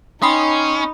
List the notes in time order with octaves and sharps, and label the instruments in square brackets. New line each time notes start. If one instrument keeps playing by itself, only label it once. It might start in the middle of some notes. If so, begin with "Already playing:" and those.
[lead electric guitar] C#4 [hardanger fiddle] D#4 [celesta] G5 C6 C7 [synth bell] B5 D#6